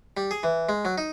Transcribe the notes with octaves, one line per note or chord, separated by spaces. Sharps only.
G3
G#4
E3
G#3
F#3
D#4